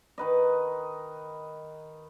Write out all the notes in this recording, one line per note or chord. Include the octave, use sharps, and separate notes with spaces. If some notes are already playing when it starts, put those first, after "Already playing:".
D#3 B4 D#5